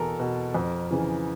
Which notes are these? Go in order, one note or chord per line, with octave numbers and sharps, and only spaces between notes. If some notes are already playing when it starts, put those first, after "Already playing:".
Already playing: E2 B2 A4 A#4
B2
F2
C#3 E3